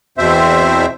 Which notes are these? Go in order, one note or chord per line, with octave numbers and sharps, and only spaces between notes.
E2 B2 C4 C5 E5